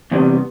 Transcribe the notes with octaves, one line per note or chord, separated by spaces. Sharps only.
E2 C3 G3 B3